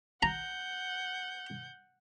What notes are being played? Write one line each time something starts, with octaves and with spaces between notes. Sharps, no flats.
F#5 A#5 G6